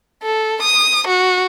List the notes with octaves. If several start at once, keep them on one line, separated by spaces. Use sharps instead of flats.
A4
D#6
F#4